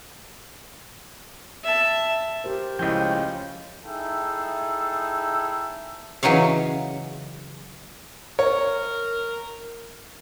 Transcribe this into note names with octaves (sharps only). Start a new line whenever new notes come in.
E5 A5
G4 A#4 C5
C#2 A2 F3 G#3 C#4 F4 G5
D#4 E4 G#4 A4 E5 G5
C#3 E3 F#3 D#4 C#5 F5
A#4 C#5